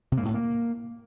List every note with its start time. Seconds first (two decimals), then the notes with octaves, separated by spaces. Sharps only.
0.12 C3
0.17 A#3
0.23 G#2
0.29 A2
0.34 A#3